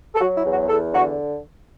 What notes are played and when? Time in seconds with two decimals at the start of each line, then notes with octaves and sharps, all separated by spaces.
0.15 A4
0.21 F#3 F#4
0.37 E4
0.45 E2
0.53 F#4
0.68 E2 A4
0.93 D3 F#4